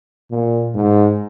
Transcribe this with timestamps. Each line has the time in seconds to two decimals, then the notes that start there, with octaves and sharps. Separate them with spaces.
0.31 A#2
0.74 G#2